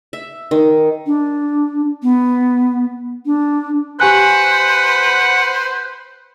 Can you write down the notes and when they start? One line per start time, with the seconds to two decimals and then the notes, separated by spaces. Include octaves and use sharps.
0.13 E5
0.51 D#3
1.06 D4
2.03 B3
3.26 D4
4.00 G4 B4 C5 F#5 G#5 F#6